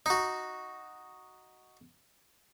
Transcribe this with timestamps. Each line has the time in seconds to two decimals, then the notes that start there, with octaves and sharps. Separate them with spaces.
0.06 D#4 F#4